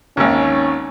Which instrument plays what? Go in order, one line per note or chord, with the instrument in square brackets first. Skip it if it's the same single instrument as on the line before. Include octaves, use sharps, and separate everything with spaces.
[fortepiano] G#1 D#2 [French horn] C#4